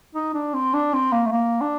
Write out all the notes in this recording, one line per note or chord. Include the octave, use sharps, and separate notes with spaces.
D#4
D4
C4
D4
C4
A#3
A3
A#3
D4